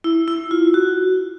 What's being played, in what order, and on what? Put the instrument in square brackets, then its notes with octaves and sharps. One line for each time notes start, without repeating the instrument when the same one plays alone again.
[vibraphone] E4
E4
F4
F#4